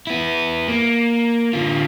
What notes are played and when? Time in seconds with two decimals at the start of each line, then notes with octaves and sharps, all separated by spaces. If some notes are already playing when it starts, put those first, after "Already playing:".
0.07 B3 E4
0.68 A#3
1.53 D3 F4